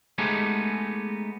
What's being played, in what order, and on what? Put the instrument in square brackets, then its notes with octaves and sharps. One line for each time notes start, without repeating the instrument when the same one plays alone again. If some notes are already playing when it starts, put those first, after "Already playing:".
[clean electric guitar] G#3 A3 B3 D#4 G4 G#4